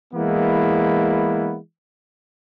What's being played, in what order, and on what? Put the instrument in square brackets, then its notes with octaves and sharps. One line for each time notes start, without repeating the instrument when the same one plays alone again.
[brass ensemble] E3 G#3 A#3 B3 E4